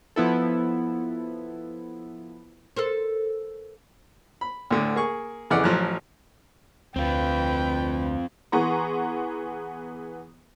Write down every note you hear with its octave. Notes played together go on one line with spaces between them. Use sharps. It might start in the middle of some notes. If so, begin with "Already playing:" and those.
F3 B3 E4 A4
A4 A#4 C5
B5
D2 A2 D3
A#3 G#4 C#6
F2 C#3 E3 D5 F#5
A1 F3 F#3 F#6
D2 C4 F4 B4 G5
E3 B3 G#4 A#5 C6 C#6